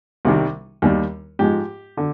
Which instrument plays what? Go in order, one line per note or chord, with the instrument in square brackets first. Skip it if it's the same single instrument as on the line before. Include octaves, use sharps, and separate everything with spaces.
[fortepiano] C2 C3 D#3 G3
D#2 D#3 G3
G#2 F3 G#3 G4
D3